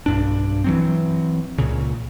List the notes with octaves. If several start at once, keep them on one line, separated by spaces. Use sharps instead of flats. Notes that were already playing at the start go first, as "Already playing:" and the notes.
B1 G2 D4
E3 F#3 C4
C#2 A#2 C#3